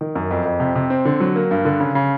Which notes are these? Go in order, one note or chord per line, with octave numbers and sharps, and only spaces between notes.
D#3
F#2
F2
F2
C3
C3
C4
D3
F#3
A#3
G2
D3
C#3
C#3